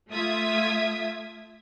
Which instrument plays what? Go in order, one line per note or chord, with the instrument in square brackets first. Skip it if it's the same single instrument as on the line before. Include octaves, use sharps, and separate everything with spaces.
[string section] A3 F4 E5 D#6 G#6 B6